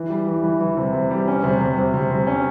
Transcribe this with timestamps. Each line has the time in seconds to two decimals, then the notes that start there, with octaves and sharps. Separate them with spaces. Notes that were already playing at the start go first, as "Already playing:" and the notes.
Already playing: E3
0.10 G3
0.27 E3
0.43 E3
0.60 E3
0.77 C3
0.94 C3
1.11 G3
1.28 C#4
1.44 C3
1.61 C3
1.78 C3
1.94 C3
2.11 C3
2.27 C#4